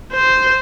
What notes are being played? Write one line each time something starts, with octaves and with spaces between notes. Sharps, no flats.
C5